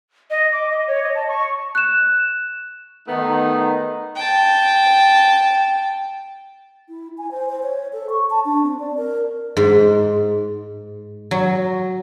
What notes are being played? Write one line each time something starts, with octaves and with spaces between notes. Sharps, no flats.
D#5
D6
D#5
C#5
D#5
A5
C#6
F#6 E7
D#3 A3 B3 D#4
G5 A5
E4
G#5
C5
C5
C#5
A4
C#6
A5
D4
C4
D5
A#4
G#2
F#3